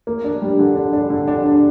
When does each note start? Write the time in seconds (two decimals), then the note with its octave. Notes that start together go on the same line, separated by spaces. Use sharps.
0.07 A#3
0.24 D4
0.42 G3
0.59 D3
0.76 D4
0.93 D4
1.10 D3
1.28 D4
1.44 D4